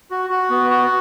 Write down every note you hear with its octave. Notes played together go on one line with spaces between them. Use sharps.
F#4
F#4
B3
F#4